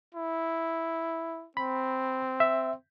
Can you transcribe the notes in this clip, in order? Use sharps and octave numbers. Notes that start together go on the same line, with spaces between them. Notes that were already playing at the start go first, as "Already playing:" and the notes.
E4
C4 B5
E5